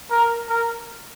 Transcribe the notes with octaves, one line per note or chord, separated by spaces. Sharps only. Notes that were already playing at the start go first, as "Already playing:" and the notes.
A#4
A#4